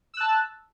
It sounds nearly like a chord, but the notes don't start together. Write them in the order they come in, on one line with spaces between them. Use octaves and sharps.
E6 F#6 A5